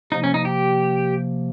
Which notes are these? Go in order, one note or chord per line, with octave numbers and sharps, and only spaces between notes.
C3 F3 A#3 D#4
C#4
D#4
G4